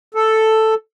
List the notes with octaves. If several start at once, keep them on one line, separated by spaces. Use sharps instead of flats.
A4